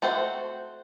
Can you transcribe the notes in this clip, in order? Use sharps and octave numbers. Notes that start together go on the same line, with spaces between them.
A3 C4 F#4 C5